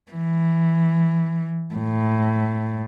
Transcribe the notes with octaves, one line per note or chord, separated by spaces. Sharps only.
E3
A2